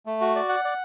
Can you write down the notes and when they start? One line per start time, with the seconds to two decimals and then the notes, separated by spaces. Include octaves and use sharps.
0.06 A3
0.21 F#4
0.36 D5
0.49 F#5
0.65 D5